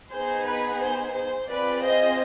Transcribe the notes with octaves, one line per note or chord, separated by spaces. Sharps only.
B3 D#4 G#4 C5
B4
C5
C5
C4 F4 G#4 B4 D5
C5 D#5